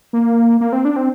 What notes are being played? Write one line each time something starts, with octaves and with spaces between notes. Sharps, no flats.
A#3
A#3
C4
D4
C4